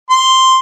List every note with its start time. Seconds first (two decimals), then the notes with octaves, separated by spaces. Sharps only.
0.10 C6